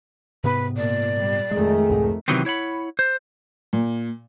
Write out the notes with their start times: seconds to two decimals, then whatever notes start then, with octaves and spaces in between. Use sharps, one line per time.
0.44 G#2 C3 B3 B4
0.77 A#2 D5
1.19 G3
1.51 F2 D#3 G#3 A3 G#4
1.90 C2 G#2
2.28 C3 D#3 E3 F#3 B3 C4
2.45 E4 C#5 F#5 B5
2.99 C5
3.73 A#2